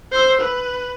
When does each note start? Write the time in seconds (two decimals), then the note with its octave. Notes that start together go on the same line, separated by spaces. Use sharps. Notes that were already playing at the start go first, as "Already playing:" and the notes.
0.12 C5 E6
0.41 B4